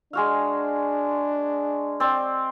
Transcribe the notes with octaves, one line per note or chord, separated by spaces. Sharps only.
G#3 D4 F#4 F5
C4 D5